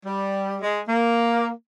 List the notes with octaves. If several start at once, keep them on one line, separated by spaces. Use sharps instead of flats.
G3
G#3
A#3